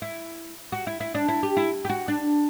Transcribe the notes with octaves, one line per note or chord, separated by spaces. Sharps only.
E4
F#4
E4
E4
D4
E4
G4
E4
G4
F#4
D4